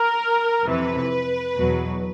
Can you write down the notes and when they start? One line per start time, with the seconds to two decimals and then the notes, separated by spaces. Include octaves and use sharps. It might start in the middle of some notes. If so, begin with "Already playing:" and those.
Already playing: A#4
0.65 F2 C3 E3 B4
1.58 E2 B2 F#3